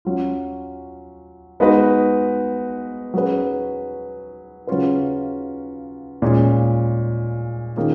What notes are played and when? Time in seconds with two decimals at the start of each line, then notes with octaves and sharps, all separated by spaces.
0.05 F#3 C#4 F4
1.60 G#3 B3 D#4 F#4 B4
3.14 F#3 C#4 G#4 B4
4.67 C#3 F#3 C#4 F4 B4
6.22 A#2 G#3 C#4
7.76 D#3 A#3 C#4 F4 G#4